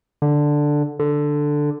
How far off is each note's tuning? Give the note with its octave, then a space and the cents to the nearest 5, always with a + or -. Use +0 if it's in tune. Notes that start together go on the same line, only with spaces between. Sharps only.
D3 +5
D3 +5